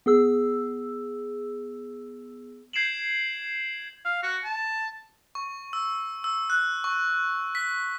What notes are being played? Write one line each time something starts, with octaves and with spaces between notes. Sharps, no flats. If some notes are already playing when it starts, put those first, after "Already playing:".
B3 G#4 E6
G6 G#6 C7 D7 E7 F#7
F5
F#4
A5
C#6
E6
E6
F#6
C#6
B6